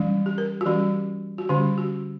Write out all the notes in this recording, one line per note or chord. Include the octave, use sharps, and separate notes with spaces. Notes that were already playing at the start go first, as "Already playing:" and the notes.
Already playing: E3 G3 C#4
G4
A#4
F#4
E3 G3 C#4 G4
F#4
D3 G3 C#4 G4
F#4